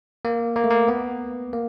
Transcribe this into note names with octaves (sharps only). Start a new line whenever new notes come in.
A#3
A#3
A3
A#3
B3
A#3